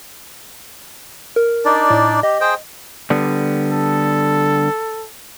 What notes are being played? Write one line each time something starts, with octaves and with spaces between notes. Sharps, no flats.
A#4
D4 D#4 D5
A2
G4 D#5
G#4 C5 G5
D3 G3 B3
A4